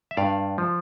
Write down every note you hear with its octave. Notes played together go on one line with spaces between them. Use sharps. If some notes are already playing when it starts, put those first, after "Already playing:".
E5
G2 D5 F5
F3